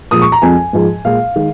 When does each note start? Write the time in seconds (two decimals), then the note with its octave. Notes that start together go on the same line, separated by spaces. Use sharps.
0.11 A#2 F3 G#3 D#6
0.22 C#6
0.32 A#5
0.42 F2 F3 G#3 G#5
0.73 G#2 F3 G#3
1.05 A#2 G#3 F5
1.36 D#3 G#3